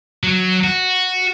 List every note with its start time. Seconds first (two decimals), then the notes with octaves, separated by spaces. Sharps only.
0.23 F#3
0.64 F#4